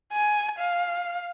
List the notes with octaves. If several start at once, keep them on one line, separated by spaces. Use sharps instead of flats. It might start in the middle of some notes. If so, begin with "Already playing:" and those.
G#5
F5